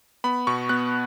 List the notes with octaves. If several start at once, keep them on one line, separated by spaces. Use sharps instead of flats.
B3 B5
B2 C#6
B3 F#6